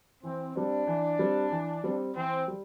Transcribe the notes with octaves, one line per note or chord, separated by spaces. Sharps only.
E3 C4
G3 C4 D4
E3
G3 C4
E3
G3 C4
E3 C4
G3